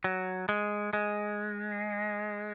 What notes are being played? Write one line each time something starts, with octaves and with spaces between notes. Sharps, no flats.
F#3
G#3
G#3